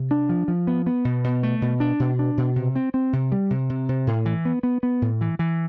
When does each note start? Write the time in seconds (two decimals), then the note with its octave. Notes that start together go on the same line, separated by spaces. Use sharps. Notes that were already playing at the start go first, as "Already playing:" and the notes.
Already playing: C3
0.11 D4
0.29 F3
0.48 F3
0.67 B3
0.87 B3
1.05 B2
1.24 B2
1.43 A3
1.62 B2
1.80 D4
2.00 B2
2.19 D4
2.37 B2
2.56 C3
2.76 C4
2.94 C4
3.13 C3
3.32 G3
3.50 C3
3.70 C3
3.89 C3
4.07 A2
4.26 E3
4.45 B3
4.63 B3
4.83 B3
5.02 A2
5.21 E3
5.39 E3